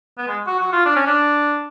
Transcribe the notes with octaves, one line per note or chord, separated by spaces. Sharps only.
B3
G#3
F#4
F#4
F4
D4
C#4
D4